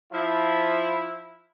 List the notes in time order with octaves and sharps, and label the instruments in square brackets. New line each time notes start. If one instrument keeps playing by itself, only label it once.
[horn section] F3 E4